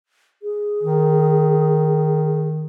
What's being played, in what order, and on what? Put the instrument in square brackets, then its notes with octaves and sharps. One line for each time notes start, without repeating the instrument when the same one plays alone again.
[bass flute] G#4
[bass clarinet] D#3